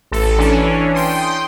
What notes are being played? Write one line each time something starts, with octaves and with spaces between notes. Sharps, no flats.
A1 A4
E3 C#4 D4
G5 C6 D#6